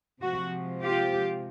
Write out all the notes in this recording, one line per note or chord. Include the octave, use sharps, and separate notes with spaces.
C3 F3 G#3 F#4
F4 G4